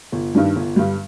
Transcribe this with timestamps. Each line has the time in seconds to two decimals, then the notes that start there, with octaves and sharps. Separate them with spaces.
0.12 G1
0.35 G2 D#3 G3 D4
0.56 G1
0.76 G2 D3 G3